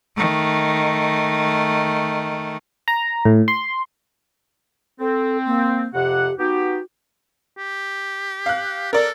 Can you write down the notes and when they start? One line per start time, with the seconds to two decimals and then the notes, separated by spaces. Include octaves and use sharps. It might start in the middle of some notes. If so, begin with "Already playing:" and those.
0.17 D#3 A3
2.88 A#5
3.25 A2
3.48 C6
5.00 C4 A4
5.46 A#3
5.94 F2 C3 G4 F#5
6.38 B3 D#4 F#4 G4
7.57 G4
8.46 F5 F#6
8.93 A4 A#4 D5